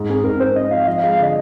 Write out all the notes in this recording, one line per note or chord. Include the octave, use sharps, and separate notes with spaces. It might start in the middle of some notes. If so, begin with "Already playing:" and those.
Already playing: G#2
C4 G#4
G#2 A#4
C4 C5
C4 D#5
F3 F5
F3 D#5
F5
G#3
F5
D3 D#5